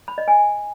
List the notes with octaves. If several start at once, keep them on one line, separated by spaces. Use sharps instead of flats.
B5
D#5
G#5